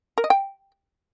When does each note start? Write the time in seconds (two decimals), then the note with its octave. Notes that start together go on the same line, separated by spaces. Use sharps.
0.18 A#4
0.24 D#5
0.30 G5